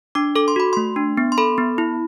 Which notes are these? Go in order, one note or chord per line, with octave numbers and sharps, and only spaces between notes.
D4 D6
A4 D6
C6
F#4 B5
A3 C6
D4
B3
C6
A4 B5
B3
E4